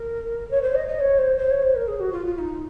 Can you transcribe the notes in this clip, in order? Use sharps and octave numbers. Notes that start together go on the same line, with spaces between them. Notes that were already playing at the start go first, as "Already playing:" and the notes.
Already playing: A#4
C#5
C5
D#5
D#5
C#5
C5
C5
C#5
C5
A#4
G#4
F#4
F4
F4
D#4